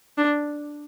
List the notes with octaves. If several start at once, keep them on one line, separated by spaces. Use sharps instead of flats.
D4